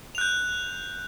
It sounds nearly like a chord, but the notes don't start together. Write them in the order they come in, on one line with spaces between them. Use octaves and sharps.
F7 F#6 G6